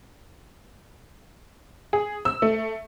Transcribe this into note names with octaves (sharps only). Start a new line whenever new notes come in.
G#4
E6
A3